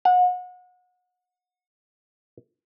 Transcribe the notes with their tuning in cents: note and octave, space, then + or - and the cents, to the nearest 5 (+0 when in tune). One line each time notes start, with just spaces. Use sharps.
F#5 -35